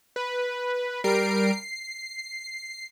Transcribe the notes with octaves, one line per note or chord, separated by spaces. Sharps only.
B4
G3 A#4 C7 D7
C7